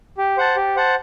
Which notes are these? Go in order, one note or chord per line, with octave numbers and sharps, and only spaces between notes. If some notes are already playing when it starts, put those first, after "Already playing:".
G4
C5 F#5 A5
G4
C5 F#5 A5